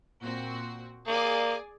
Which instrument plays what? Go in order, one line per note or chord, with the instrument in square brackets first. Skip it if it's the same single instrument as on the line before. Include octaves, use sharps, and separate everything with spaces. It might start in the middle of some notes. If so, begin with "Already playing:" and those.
[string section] A#2 C4 F#4
[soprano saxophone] A#3 [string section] G#4 D5 G#5